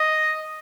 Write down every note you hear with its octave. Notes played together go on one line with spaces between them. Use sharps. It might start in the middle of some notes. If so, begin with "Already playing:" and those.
Already playing: D#5